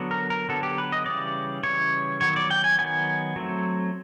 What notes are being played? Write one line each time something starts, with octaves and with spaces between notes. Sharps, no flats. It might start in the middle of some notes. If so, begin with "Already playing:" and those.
Already playing: D3 F#3 B3
A#4
A#4
D3 F#3 B3 A4
G4
B4
D#5
C#3 E3 G3 D5
C#3 E3 G3 C#5
D#3 F#3 B3 C#5
D5
G5
G#5
D#3 F#3 B3 G#5
F#3 A3 C4